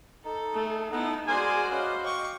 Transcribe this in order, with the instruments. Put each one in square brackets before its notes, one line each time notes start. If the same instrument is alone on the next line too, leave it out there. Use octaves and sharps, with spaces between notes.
[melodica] D#4 [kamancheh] A4
[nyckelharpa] A3 [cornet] G#4
[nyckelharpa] B3 E4 [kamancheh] D#4 [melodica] A4 F#5 A#5
[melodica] G#3 A#4 D6 [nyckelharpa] F#4 C5 [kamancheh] G#4 D5 [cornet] G#5
[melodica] C#4 B4 D5 [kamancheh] D#5 [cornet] F5
[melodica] G5 D6 [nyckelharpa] C#6